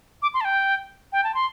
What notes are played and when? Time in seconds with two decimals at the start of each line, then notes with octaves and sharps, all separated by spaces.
0.22 D6
0.34 C6
0.41 A5
0.45 G5
1.13 G5
1.24 A5
1.35 C6